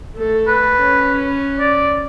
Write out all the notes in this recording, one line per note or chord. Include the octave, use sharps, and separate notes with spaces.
A3 A4
B4
C#4
D5